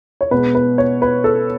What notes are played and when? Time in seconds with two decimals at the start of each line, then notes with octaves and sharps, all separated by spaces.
0.21 C#5
0.31 B2 G#3 B4
0.55 B4
0.78 C#5
1.02 B4
1.24 A4